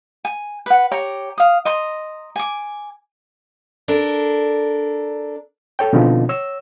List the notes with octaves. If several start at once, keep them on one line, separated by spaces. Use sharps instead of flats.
G#5
B4 F#5
G4 C#5 A#5
F5 D#6
D#5 A#5 C6
G#5 D6
D4 A4 A#4
A4 C#5 G5
B2 D3 F3 C4 D#4 F4
C#5 E6